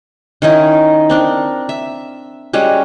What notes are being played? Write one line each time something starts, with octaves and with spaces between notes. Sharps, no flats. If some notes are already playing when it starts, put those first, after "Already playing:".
D#3 C#4 D#4 E4
C4 D4 A#4
E5
G3 G#3 C#4 F#4